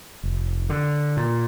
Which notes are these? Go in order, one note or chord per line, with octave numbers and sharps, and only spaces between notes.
F1
D3
A#2